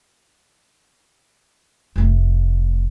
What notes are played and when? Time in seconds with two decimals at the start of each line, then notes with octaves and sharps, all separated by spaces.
1.96 F1 A3